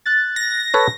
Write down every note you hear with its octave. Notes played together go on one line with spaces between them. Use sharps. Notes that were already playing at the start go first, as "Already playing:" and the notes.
F#6 A6
A#6
A4 B4 C#5